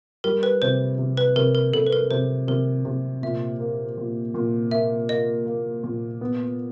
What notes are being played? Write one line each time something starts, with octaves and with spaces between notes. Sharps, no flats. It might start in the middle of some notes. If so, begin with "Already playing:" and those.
G3 A#4
B4
C3 C5
C3
B4
C3 A#4
A#4
C3 A4
B4
A#4
C3 C5
C3 A#4
C3
A#2 E5
A#3
A#2
A#2
A#3 E5
A#3 D#5
A#3
A#2
B3